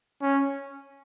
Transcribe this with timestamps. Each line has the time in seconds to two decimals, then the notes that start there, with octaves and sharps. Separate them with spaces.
0.22 C#4